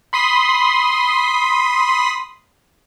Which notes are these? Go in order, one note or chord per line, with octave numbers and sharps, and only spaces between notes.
B5 C6 D#6 B6